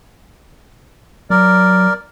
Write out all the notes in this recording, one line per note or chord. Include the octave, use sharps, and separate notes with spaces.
F#3 A#4 D5